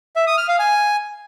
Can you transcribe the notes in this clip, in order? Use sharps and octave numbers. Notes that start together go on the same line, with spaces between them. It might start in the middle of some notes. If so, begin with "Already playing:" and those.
E5
D#6
F6
F5
G#5